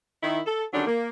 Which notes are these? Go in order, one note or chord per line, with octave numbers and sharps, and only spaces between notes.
D#3 E4
A4
D3 D#3 F#3 G3 C#4 D4
A#3